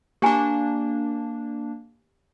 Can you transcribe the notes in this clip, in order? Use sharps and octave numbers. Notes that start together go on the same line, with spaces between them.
A#3 D4 G4 G#5 A#5